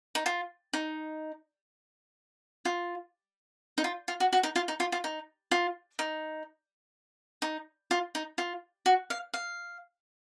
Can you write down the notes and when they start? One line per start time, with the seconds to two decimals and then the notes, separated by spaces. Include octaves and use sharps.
0.15 D#4
0.26 F4
0.73 D#4
2.65 F4
3.78 D#4
3.84 F4
4.08 F4
4.20 F#4
4.33 F#4
4.43 D#4
4.56 F4
4.68 D#4
4.80 F4
4.92 F4
5.04 D#4
5.51 F4
5.99 D#4
7.42 D#4
7.91 F4
8.15 D#4
8.38 F4
8.86 F#4
9.10 F5
9.34 F5